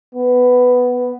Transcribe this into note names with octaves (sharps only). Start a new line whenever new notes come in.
B3